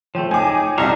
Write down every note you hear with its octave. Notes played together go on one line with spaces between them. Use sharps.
F3 A3 C#5 G5
D#4 G#4 G#5 D6
C2 D5 D#5 A5 A#5 C#6